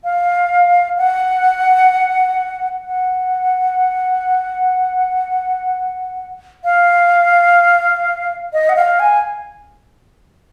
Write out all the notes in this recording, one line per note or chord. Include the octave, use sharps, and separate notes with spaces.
F5
F#5
F#5
F5
D#5
F#5
F5
G#5